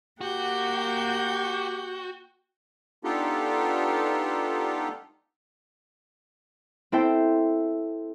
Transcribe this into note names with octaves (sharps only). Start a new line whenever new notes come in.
A#3 F#4 G4 F#5 G5 G6
B3 D4 D#4 F4 G4 A4
C4 E4 A4 C5 G5